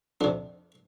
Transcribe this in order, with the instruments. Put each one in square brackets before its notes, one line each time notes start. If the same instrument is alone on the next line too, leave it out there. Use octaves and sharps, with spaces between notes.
[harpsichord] F2 C3 D4